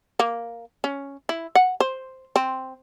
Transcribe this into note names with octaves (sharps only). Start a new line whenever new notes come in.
A#3
C#4
E4
F#5
C5
C4